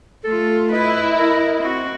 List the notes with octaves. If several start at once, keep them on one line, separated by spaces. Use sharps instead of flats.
A3 F4 A4
E4 B4 D#5
A#4
C4 F#4